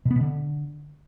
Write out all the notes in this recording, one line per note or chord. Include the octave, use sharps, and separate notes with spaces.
B2
B3
B2
D3